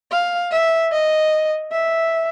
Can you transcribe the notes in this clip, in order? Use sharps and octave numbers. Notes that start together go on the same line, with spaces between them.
F5
E5
D#5
E5